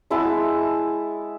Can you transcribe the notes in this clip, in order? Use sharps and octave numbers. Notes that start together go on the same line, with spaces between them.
G#3 E4 F#5 A5